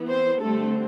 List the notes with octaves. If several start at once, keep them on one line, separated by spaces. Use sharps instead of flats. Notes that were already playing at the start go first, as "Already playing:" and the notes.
Already playing: E3 B3
C4 C5
D3 G3 A3 C4 A4